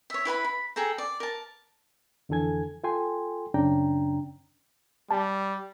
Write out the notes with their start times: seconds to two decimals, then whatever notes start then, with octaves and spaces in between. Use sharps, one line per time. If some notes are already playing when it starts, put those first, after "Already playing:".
0.10 C#5 E5
0.25 E4 B4 G#5 B5
0.45 B5
0.76 G#4 A4 G5 A#5
0.98 D5
1.20 A#4 A5
2.29 F2 D3 E3 A4 G#5 G#6
2.84 F4 A4 G5 G#5 C6
3.54 F#2 C#3 C#4 D4 G5 A#5
5.11 G3 A5